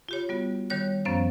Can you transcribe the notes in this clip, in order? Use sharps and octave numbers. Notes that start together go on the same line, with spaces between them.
F4 G4 C#5
G3 B3 F#4
D#3 G3 C#5 F#6
F#2 F3 B3 C#4 C5 F5